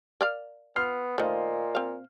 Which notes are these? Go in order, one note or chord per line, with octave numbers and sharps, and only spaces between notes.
A#4 D5 F5
B3 F4 F6 C7
A#2 D#3 A3 C5 D#5 F5
C4 F5